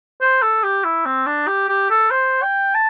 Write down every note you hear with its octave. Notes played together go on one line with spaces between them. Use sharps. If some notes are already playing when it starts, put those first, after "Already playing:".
C5
A4
G4
E4
C4
D4
G4
G4
A4
C5
G5
A5